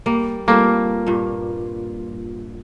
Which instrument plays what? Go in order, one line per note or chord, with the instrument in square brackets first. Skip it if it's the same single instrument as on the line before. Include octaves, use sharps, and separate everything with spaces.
[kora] G3 A#3
[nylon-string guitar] G3 [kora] A3 C4 B4 [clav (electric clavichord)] A#3 [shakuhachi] F4
[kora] G2 A#2